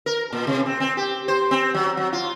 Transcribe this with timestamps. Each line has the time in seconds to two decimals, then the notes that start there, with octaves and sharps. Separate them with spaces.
0.06 A#4
0.33 A#2
0.47 C3
0.66 C4
0.80 C4
0.97 G4
1.28 C5
1.51 C4
1.75 F#3
1.97 F#3
2.13 F4